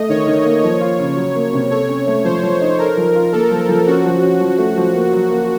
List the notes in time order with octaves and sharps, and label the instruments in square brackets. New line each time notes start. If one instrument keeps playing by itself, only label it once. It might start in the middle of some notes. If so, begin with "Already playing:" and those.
Already playing: [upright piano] A3 [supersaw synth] D#5
[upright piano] D#3 [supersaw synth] C#5
[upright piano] D#3
A#3
[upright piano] F3 [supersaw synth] C#5
[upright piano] F4
C#3
F#3
A#3
C3
[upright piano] A4 [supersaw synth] C#5
[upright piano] C#4
A3
[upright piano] F3 [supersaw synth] C5
[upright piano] F3
D#4
[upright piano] A4 [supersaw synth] A#4
[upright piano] F3
F4
[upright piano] A#3 [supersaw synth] A4
[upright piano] F3
F3
[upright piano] C#4 [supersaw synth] F#4
[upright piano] F3
C#4
F3
A3
F3
A#3
F#3
A#3